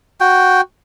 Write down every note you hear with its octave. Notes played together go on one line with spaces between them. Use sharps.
F#4 G5